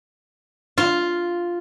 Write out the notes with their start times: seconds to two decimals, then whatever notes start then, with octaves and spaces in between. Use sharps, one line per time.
0.78 F4